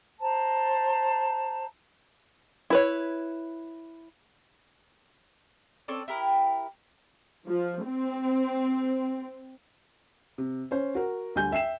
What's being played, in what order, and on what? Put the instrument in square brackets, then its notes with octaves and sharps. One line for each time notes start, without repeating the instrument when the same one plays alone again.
[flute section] C5 A5 A#5
[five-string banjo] E4 B4 C#5
[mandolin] C4 C#4 A4 D5
E4 G4 A#4
[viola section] F3
C4
[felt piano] C3
C#4 C5 C#5
F#4 A#4
D2 G3 G#5 G6
E5 G5 C7 E7